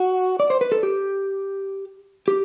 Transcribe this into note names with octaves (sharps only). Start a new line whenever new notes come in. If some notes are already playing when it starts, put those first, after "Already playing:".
Already playing: F#4
D5
C5
B4
A4
G4
G4